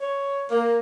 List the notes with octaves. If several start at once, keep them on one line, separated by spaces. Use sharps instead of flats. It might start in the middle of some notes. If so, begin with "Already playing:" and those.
C#5
A#3